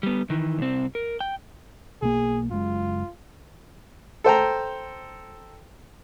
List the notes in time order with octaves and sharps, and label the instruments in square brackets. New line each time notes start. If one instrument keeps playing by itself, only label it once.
[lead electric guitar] G3 B3
D#3 E3
C2 C4
A#4
G5
[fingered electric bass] B1 A#3 [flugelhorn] G#4
[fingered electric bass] F#1 G#3 [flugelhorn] F4
[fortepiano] A4 C5 G5 A#5